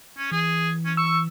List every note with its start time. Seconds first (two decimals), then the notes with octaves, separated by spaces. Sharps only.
0.17 C#4
0.32 E3 G#4
0.85 C#4
0.97 C#6 E6